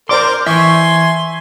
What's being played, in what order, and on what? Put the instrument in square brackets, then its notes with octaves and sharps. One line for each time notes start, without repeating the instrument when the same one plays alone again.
[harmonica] A#4 [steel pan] C5 D5 D6 [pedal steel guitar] C6
[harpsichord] E3 G5 [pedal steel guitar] E5 C#6 [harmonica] G#5 C6